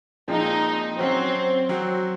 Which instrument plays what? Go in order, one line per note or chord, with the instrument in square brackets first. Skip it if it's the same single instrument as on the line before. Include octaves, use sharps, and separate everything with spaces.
[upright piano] A#2 F3 G#3 C4 [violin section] D#4
[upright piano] F#3 C#4 F#4 [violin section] C4
[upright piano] F#3 C4 F#4